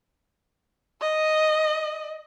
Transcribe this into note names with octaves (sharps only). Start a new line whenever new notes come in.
D#5